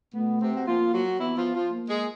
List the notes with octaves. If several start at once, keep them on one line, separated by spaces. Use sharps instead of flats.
B2 A3 B3
C3 C4
F#4
F3 A#3 F4
F#3 F#4
E3 B3 E4
F3 F4
F3 F4
A#3
G#3 G#4